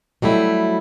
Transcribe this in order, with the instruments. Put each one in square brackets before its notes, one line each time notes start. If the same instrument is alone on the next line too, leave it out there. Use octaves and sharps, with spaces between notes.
[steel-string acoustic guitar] F#3 G3 A3 E4